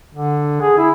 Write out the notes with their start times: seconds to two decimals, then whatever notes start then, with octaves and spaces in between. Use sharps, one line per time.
0.15 D3
0.61 G#4
0.78 E4